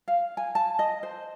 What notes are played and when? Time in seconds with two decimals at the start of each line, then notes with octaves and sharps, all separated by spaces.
0.08 F5
0.37 G#5
0.55 A5
0.79 D#5
1.03 C5